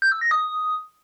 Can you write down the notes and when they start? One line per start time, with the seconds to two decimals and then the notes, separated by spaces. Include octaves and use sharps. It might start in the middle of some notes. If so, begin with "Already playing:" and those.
0.02 G6
0.12 E6
0.21 A#6
0.31 D#6